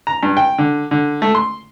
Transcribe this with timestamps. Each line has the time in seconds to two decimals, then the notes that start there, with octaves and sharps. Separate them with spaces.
0.07 A#5
0.23 G2
0.37 G5
0.58 D3
0.91 D3
1.22 A3
1.35 C6